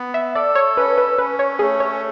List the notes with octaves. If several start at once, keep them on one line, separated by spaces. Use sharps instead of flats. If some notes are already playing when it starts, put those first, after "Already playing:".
Already playing: B3
E5
A4 D5
C#5
C#4 B4
B4
C#4 B4
C#5
A3 G#4
C#5